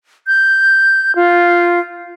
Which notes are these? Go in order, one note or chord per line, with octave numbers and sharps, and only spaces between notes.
G6
F4